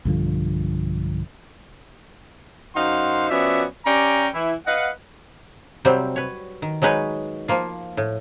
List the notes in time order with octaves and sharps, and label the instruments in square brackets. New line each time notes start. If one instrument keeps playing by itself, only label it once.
[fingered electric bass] B1 G2 D3 F3
[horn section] F#2 D#4 C5 F5 F#5 C6
F3 B3 C#4 F#4 D5 E5
C#4 G4 D5 G5 G#5 A#5
E3 E4
B4 D#5 F5 F#5
[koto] C3 F#3 G3 C4
B4 C#5
D#3
F#3 G#3 D#4 B4 C#5
F3 A#3 F4
A2